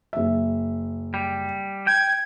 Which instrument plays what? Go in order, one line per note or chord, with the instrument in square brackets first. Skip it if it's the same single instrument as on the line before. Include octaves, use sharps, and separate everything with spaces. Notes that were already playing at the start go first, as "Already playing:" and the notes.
[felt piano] F#1 E5
[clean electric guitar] G3
[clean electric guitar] G5 [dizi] G#6